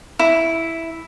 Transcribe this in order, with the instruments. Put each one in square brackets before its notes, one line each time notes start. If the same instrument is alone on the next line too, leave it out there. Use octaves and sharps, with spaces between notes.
[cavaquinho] E4